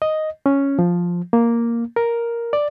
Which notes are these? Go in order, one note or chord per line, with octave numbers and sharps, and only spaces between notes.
D#5
C#4
F3
A#3
A#4
D5